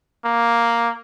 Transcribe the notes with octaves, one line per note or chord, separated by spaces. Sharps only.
A#3